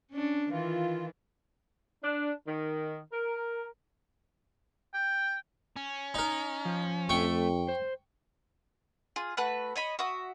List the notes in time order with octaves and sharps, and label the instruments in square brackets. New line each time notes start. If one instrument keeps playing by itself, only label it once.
[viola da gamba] C#4 D4
[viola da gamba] D#3 E3 [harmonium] F4
[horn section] D4
D#3
A#4
[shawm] G5
[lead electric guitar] C#4
[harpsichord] D#4 A#4
[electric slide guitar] F3
[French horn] F2 [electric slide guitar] A3 [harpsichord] G5 C#6
[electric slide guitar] C5
[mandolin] F4 G#4
A3 F#4 B4 F#6
C#5 D#5 B5
F#4 E5 D#6